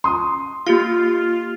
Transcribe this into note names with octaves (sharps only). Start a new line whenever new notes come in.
C6 D#6
A#3 F4 G4 F5